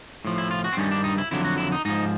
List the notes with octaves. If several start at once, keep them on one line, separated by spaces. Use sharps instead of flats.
A2 F3
E4
F4
F#4
C4
G2 D#3 G3 C#4
D4
D#4
E4
F2 D3 F#3 E4
F#4
E4
D#4
G#2 F3 D#4